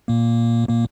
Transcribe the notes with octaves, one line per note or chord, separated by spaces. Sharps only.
A#2 A#3
A#2 A#3